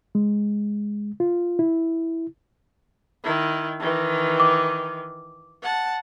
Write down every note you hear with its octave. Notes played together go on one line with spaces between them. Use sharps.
G#3
F4
E4
D#3 E4
D#3 E3
D6
F#5 A5